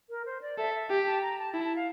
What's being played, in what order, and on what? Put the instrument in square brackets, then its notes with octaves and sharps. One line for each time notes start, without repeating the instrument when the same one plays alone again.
[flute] A#4
C5
D5
[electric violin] A4 [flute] E5
[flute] E5
[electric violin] G4 [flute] G5
[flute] A5
A#5
A5
[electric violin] E4 [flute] A5
[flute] A5
F5